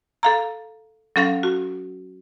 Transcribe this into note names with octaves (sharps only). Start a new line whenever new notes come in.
A4 F5 A#5
F#3 C#4 A4 F5 A#6
F#4